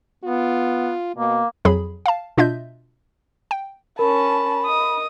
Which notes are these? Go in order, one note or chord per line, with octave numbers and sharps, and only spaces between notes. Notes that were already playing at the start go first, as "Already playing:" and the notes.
B3 F4
B2 A#3
F2 F#3 G#4 B5
F5 A5
B2 D4 F4 D#5 E5 G6
G5
C#4 A#4 A5 B5
D#5 D#6